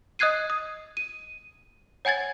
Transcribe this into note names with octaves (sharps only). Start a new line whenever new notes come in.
D#5 D#6 F#6 G#6 C7 D#7
D#6
D#7
C#5 F#5 G#5 G#6 A6